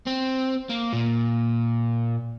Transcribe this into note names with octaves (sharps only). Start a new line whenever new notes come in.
C4
A#3
A#2